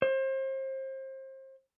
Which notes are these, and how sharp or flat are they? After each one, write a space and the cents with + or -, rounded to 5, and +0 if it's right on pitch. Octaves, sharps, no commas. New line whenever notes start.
C5 +30